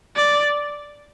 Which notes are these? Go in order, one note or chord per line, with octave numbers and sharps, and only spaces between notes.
D5